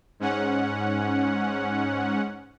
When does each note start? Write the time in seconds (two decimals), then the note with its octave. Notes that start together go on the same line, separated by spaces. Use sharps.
0.20 G#2 C#4 F#5